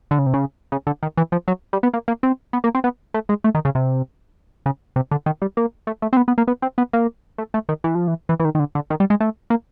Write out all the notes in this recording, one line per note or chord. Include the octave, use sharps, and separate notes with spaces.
D3
C#3
C3
C#3
C#3
D3
D#3
E3
F3
F#3
G3
B3
A#3
A#3
C4
B3
A#3
C4
B3
A3
G#3
A3
D#3
C#3
C3
C#3
C3
D3
D#3
G3
A#3
A3
A3
C4
B3
B3
A#3
B3
C4
B3
A#3
A3
A3
D#3
E3
F3
E3
E3
E3
D#3
D#3
D3
D3
D#3
G3
G#3
A3
A#3